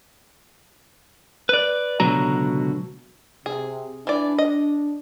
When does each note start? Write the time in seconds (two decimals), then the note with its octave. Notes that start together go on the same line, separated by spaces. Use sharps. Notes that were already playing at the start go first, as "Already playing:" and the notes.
1.49 B4 D5
2.00 C#2 B2 D3 F#3 F#4 A#5
3.46 C3 G#4
4.07 E3 D4 D5
4.38 D#5